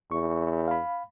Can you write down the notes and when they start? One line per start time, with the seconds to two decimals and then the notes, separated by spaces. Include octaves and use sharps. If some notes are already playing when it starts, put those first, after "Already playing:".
0.11 E2 C#6
0.68 F5 B5